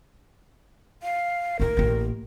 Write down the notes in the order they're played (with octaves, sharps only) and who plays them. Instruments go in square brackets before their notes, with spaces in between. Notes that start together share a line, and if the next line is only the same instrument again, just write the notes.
[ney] F5
[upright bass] A3 D#4 [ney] A#4
[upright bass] A1 A#3